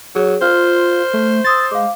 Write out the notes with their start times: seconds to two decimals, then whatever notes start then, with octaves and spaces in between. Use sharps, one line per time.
0.15 F#3 G#4 C#5
0.42 F4 C5 F6
1.14 A3
1.44 C6 D#6 E6 A6
1.71 G#3 F5 D6